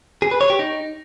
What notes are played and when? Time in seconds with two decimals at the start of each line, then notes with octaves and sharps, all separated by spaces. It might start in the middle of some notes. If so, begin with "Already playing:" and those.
0.22 G#4
0.31 B4
0.41 C#5
0.50 G4
0.59 D#4